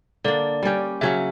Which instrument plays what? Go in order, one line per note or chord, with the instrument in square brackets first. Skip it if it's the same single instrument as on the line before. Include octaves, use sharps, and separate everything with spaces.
[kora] D3 A#3 D4 [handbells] D5
[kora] G3 C#4 G4
[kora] C#3 F#3 C#4 F#4 [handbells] E5